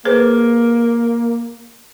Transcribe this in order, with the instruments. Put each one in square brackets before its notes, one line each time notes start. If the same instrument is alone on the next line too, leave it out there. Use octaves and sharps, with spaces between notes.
[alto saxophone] A#3 [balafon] G#4 B4 C5